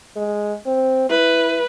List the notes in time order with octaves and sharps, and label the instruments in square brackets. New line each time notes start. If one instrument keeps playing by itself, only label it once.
[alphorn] G#3
C4
[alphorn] E4 [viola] B4